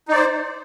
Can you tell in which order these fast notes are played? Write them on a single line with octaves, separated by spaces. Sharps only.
D#4 D5 C5